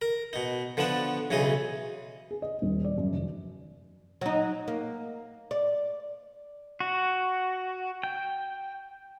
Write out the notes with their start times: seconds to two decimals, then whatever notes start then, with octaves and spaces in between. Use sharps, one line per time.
0.02 A#4
0.33 B2 D#4
0.77 D3 F3 B3 D4 A5
1.31 B1 C#3 E3 D#4 D#5
2.31 G#4
2.42 D#5
2.62 D#1
2.84 D5
2.98 F#2
3.12 F1
4.21 F#3 D#4
4.68 A#3
5.51 D5
6.80 F#4
8.03 G5